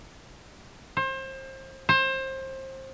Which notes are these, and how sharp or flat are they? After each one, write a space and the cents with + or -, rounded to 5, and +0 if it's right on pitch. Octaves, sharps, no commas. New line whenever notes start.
C5 +30
C5 +25